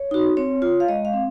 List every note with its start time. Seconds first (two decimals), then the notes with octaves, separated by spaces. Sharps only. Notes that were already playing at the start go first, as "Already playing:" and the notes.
Already playing: C#5
0.11 D#4 F#4
0.37 C4 C#5
0.62 F4
0.80 F5
0.89 G#3 D#5
1.05 F5
1.13 C4